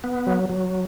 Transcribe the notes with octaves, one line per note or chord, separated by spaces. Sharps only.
B3
F#3
F#3